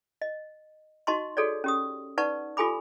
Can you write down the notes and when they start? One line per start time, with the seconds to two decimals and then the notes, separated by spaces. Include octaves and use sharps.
0.22 D#5
1.07 D#4 F#4 D#5 A5 C6 C#6
1.37 F#4 G#4 A4 C#5 D5
1.64 C#4 G4 D#6
2.18 D#4 B4 D5 F#5 A5 C#6
2.57 F4 G4 A4 G#5 B5 D6